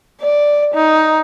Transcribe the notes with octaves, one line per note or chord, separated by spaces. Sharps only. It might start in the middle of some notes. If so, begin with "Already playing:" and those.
D5
D#4